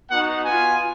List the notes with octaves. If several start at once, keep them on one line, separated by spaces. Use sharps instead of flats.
B3 D#4 F#4 F#5
B3 F4 G#5